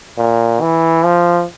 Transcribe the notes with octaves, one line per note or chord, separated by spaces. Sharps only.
A#2
E3
F3